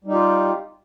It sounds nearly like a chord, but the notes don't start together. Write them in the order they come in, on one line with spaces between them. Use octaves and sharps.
G3 D#4 G4 F4